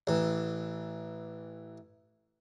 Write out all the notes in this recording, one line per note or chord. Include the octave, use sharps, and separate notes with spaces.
A1 E3